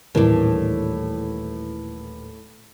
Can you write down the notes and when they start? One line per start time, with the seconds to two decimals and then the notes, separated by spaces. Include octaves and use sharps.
0.15 D#1 A2 E3 D4 A#4